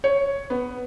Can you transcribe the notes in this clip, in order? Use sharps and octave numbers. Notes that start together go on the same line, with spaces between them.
C#5
B3